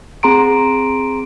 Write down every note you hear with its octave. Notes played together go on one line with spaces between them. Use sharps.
C4 G#4 A#5 C6 D7